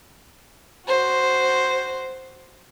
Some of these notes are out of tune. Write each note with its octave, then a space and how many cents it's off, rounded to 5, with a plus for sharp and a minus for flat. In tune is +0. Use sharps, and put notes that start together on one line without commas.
F#4 +5 C5 +0